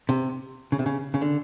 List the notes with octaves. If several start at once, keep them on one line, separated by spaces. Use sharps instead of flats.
C3
C#3
C3
C#3
C#3
D3